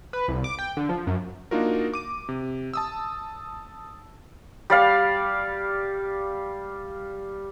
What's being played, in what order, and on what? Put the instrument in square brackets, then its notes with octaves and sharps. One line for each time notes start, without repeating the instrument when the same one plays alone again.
[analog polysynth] B4
C2
D6
G5
D3
F3
F#2
[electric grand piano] A#3 D4 D#4 F4 F#4 A#4
D6 D#7
C3
A5 D#6 E6
[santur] G3 D5 F5